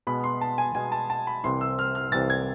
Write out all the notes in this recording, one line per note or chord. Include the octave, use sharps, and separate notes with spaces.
B2 G#3 B3 B5
C6
A5
G#5
B2 G#3 B3 G#5
A5
A5
B5
C2 C3 E3 C6
E6
F6
F6
C2 C3 E3 A6
G#6